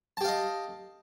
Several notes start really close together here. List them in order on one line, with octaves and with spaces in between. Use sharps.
A5 G4 F5 D#5